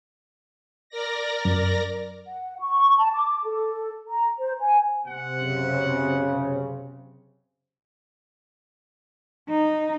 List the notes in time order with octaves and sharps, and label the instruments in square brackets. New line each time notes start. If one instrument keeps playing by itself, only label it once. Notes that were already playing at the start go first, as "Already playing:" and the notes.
[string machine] A#4 D5 A#6
[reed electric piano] F#2
[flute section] F#5
C#6
A5
D6
A4
A#5
C5
G#5
[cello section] C3 [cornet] F#5
[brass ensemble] F#2 C#3
[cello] D#4